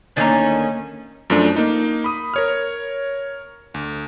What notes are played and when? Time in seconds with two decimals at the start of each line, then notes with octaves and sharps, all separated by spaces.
0.17 D2 D#3 A#3 C#4 D4 A#5 A6
1.30 F#2 F3 A3 D4
1.56 A#3 D#4
2.04 B5 D#6
2.34 A#4 C#5 F6
3.74 D2